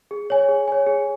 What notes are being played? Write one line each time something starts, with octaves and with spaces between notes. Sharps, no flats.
G#4
C#5 G#5
G#4
C#5 G#5
G#4